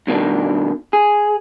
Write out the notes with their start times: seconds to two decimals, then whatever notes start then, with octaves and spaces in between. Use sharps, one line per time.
0.07 G2 B2 D#3 D4
0.93 G#4